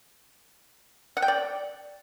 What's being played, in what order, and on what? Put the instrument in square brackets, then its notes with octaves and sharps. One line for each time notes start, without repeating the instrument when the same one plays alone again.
[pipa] F#5
G5
D5